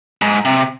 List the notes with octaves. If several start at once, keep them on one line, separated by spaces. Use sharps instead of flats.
G#2
C3